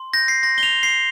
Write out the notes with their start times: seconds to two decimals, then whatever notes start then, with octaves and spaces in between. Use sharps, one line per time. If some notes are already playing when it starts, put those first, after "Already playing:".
Already playing: C6
0.14 G6 A#6
0.28 C7
0.43 C6 A#6
0.58 G7
0.63 F7
0.74 C6
0.83 C7